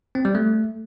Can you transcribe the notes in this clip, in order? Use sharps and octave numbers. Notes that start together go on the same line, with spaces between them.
C4
G3
A3